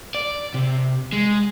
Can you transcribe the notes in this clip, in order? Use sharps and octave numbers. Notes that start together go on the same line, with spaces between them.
D5
C3
G#3